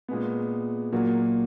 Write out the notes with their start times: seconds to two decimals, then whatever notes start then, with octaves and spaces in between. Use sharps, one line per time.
0.08 A#2 G#3 B3
0.93 A#2 F#3 A#3